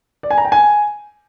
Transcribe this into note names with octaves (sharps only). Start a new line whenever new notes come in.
D5
G#5
A#5
G5
G#5